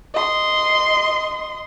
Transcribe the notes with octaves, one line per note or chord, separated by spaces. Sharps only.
D#5 C6